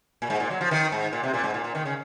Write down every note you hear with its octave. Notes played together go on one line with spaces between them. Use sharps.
A#2
G#2
A#2
F#3
F3
D#3
G#2
A#2
C3
A#2
G#2
A#2
A#2
D#3
C#3